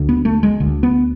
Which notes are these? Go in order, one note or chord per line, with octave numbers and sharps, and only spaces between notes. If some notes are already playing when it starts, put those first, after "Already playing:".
Already playing: D2 D3
B3
A3
G#3
D2 D3
B3